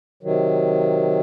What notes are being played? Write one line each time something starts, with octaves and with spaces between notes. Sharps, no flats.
C3 D#3 F#3